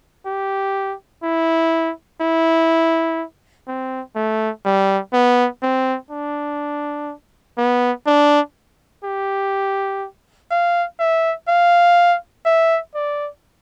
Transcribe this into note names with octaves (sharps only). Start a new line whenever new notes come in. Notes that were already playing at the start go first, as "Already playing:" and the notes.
G4
E4
E4
C4
A3
G3
B3
C4
D4
B3
D4
G4
F5
E5
F5
E5
D5